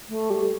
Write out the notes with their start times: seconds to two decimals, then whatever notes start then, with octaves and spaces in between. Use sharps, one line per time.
0.09 A3
0.30 G3